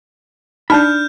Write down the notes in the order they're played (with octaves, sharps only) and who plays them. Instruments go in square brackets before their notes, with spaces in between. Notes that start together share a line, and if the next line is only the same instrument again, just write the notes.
[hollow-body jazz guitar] D4 B5 [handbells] D#4 A5 [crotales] F6 G6